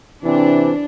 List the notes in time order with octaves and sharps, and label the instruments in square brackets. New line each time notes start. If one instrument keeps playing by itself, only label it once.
[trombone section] C3 E3 C4 [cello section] D4